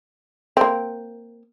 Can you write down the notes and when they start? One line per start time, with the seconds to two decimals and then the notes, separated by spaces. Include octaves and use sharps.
0.57 A#3 C4